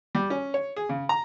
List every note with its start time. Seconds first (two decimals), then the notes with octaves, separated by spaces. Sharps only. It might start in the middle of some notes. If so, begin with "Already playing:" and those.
0.15 G3
0.30 C#4
0.54 C#5
0.76 G#4
0.89 C#3
1.09 A#5